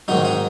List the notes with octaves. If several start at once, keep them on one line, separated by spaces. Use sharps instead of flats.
G#2 D#3 F#3 D#4
D#4